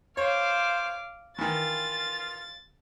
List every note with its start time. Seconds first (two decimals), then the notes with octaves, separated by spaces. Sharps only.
0.17 C5 C#5 F5 D6
1.38 D#3 E3 F4 A6